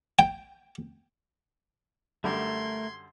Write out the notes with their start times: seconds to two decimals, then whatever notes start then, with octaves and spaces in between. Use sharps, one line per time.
0.19 G5
2.24 F#2 D3 G3 A3 A#4 C6 G#6